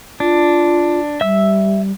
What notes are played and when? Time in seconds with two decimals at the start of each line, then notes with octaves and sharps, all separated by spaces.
0.20 D4 F4
1.21 G3 E5 E6